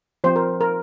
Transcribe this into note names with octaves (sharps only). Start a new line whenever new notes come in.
F3 C4 C5
A#4
A#4